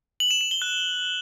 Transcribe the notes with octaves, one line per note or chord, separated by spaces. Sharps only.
F#7
E7
E7
G7
F#6